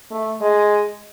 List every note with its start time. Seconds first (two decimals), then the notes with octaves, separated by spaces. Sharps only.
0.11 A3
0.41 G#3